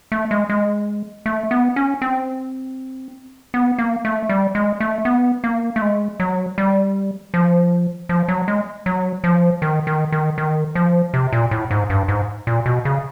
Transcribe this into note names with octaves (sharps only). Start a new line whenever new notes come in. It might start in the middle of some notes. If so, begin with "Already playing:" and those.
A3
G#3
G#3
A3
B3
C#4
C4
B3
A#3
A3
G3
G#3
A3
B3
A#3
A3
G#3
F#3
G3
F3
F3
F#3
G#3
F#3
F3
D#3
D#3
D#3
D#3
F3
C3
A#2
A2
G#2
G2
G#2
A#2
B2
C#3